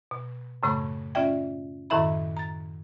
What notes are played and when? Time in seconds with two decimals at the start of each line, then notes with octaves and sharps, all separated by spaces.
0.11 B2
0.63 F#2 A2 C#3 A3 B5 C#6
1.15 C#4 F4 D5 E5 G5
1.90 F#2 A2 D#3 E4 E5 B5
2.37 A#5 A6